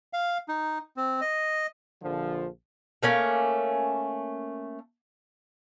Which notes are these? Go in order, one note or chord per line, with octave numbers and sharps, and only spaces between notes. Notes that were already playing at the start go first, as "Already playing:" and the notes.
F5
D#4
C4
D#5
A#1 D3 F3
A3 A#3 C#4